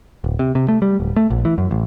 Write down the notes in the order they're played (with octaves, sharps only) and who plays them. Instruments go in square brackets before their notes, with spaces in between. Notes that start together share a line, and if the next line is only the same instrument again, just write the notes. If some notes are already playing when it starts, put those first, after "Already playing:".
[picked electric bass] D1
C3
C3
A3
G3
D1
A3
A#1
E3
F#2
A1